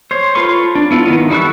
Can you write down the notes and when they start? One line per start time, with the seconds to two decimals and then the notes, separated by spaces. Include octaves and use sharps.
0.11 C5 C#5
0.35 F4 A4 B4 C6 C#6
0.75 D4
0.91 B3 E4 F4
1.05 D#3 A#3 B3
1.30 G3 E4 A4 C#6 F#6